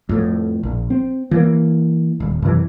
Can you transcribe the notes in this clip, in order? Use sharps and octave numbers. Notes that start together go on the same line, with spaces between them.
F2 A2
A#1
C4
E3 A#3
D#1
F#2 C3 E3